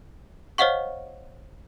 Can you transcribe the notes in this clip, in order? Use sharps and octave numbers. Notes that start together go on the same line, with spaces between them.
C5 C#5 D#5 F5 F#5 C#6